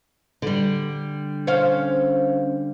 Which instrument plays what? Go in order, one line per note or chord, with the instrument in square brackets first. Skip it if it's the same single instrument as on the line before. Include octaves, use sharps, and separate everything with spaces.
[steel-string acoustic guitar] D3 G3
[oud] C#4 C5 F5